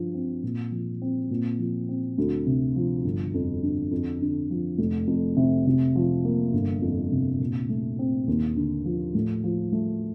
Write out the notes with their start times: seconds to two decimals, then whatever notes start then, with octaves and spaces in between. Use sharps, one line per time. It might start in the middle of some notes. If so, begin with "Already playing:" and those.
Already playing: G2 F3
0.14 C4
0.43 A#2
0.71 F3
1.02 C4
1.31 A#2
1.59 F3
1.89 C4
2.18 D2
2.46 C3
2.76 F3
3.04 G1
3.34 F2
3.63 D3
3.91 F2
4.21 D3
4.50 F3
4.78 F1
5.07 F2
5.37 C3
5.66 C3
5.95 F3
6.25 A#3
6.53 G1
6.82 F2
7.12 C3
7.40 A#2
7.69 A3
7.99 C4
8.27 D#2
8.56 D3
8.85 F3
9.15 A2
9.44 F3
9.72 A3